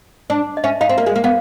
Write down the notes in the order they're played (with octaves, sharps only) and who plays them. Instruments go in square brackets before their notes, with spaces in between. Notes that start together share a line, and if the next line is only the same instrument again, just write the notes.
[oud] D4
[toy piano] D#5
[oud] C#4 [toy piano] E5
[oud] D#4 [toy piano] F5
[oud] C4
A#3
G#3
A#3
[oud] B3 [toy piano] F5